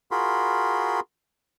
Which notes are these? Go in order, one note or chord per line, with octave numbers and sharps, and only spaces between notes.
F4 F#4 G#4 A#4 B5 C6